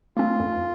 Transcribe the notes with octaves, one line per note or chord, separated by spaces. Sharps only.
A3 C4 F4
F2